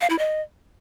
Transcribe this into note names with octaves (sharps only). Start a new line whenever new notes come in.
F5
E4
D#5